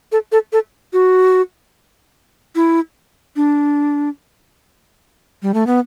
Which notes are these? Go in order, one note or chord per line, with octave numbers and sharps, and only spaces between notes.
A4
A4
A4
F#4
E4
D4
G3
A3
B3